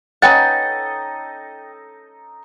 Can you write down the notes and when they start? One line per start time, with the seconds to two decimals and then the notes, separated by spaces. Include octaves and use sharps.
0.22 C#4 D#4 A4 B4 D#5 F#5 G5 A6